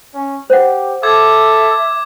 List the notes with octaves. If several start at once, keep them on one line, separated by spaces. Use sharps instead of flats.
C#4
G4 C5 F#5
A4 E5 D6 G#6